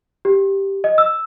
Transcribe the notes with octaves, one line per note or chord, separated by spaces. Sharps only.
G4
D#5
E6